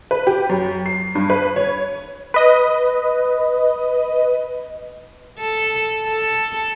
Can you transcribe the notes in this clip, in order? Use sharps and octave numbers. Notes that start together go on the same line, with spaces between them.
B4
G4
F#2
C7
G2
B4
C#5
B4 D#5
A4
A4